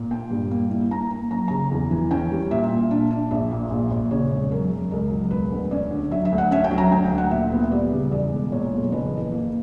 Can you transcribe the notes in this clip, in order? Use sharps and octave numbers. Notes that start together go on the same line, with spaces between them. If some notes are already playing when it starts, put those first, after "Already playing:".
Already playing: A#2
A#3 G5
G2
A#3
E4
A#3 A#5
A#3
F#2 A#5
C#3 A#5
E2
E3
C#4 G5
G3
A#2 E5
A#2
D4
D4
A#1 E5
A#2
A#1
A#1
C#3 C#5
E1
F#2 A#4
F#2
C#2 A#4
F#3
E1 B4
D2
C#4 D5
D3
F#3 E5
E5
D2
F#5
C#4 E5
G5
F#3
A#5
D2 G5
G5
D2
F#5
A#2 E5
B3
G3 D5
C#3
E2 D5
E1
A#2 C#5
B1
F#1 B4
E3
A#3